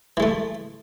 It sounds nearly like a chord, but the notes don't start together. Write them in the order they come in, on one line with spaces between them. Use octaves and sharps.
E3 G#3 A3